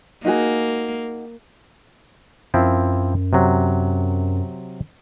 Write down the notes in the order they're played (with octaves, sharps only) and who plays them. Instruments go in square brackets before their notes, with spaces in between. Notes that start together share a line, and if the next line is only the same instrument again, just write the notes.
[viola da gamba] A#3 [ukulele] D#4 F#4 G#4
[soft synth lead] F#2 [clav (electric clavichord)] F3 C4 E4
[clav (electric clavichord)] C3 F#3